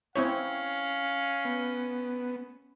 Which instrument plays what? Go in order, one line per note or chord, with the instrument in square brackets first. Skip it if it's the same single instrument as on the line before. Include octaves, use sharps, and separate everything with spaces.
[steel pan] C4 E4 C#5 [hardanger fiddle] C#4 [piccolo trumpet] F5
[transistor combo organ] B3